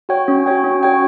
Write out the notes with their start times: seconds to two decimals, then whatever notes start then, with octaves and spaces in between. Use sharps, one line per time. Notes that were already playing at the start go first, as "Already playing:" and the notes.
0.09 F#4 C#5 G5
0.28 C#4
0.46 F#4 C#5 G5
0.64 C#4
0.83 F#4 C#5 G5